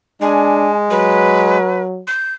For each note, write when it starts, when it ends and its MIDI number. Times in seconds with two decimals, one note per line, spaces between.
0.22 1.57 56
0.22 0.69 62
0.22 0.76 80
0.91 2.02 54
0.91 1.82 71
2.08 2.34 91